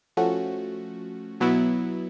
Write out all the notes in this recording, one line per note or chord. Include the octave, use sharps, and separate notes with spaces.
F3 A3 C#4 F#4
B2 F#3 B3 E4